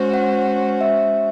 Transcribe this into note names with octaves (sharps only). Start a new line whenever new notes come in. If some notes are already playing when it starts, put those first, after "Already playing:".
Already playing: G#3 C#4 F#4 C5
F#5
E5